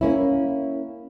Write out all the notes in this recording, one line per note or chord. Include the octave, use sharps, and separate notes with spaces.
A#3 C#4 E4